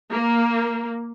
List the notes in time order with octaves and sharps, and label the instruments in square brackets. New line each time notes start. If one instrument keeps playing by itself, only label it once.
[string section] A#3